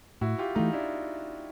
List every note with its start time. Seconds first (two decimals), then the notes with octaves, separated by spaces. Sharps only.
0.21 A2 E4 F#4
0.38 F4 G4
0.56 E3 A3 D#4 F4
0.73 D4 E4